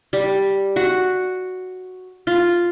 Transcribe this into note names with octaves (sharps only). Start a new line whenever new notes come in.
G3
F#4
F4